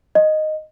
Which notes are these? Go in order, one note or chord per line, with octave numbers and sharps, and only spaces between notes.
D#5